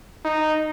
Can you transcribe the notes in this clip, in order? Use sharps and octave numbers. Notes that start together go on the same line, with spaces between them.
D#4